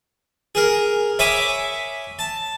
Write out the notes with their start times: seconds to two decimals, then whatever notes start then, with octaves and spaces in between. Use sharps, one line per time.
0.55 G#4 A#4
1.19 C#5 E5 G#5 B5 D6 D#6
2.19 A5